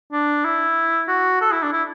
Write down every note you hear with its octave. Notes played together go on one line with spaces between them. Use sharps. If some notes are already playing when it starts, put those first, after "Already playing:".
D4
E4
F#4
A4
E4
D4
E4